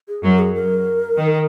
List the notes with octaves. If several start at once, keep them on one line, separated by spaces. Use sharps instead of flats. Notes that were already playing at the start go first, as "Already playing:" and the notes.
G#4
F#2 F#3 A#4
G#4
A#4
D#3